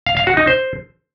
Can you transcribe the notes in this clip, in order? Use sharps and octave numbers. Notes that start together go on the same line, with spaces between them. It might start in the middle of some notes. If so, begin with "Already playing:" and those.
F5
F5
F#4
D#4
C5